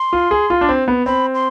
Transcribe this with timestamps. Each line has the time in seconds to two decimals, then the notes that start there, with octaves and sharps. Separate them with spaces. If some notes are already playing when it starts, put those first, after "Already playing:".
Already playing: C6
0.13 F4
0.31 G#4
0.50 F4
0.61 D4
0.69 C4
0.88 B3
1.06 C4 B5
1.34 C6